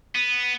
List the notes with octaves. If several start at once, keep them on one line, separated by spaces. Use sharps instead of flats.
B3